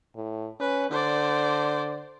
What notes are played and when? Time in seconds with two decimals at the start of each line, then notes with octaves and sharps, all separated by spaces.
0.16 A2
0.60 C#4 B4
0.91 D3 C5 D5